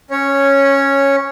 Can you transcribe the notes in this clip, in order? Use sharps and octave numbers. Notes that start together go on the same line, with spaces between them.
C#4 C#5